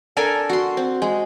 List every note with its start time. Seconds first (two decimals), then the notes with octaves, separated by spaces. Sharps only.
0.17 D4 A4 A#4 G#5
0.49 F#4 C6
0.77 C4
1.02 G#3